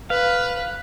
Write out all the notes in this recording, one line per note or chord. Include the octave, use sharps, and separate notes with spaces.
B4 F5